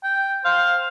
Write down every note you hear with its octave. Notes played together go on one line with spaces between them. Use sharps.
G5
C5 F5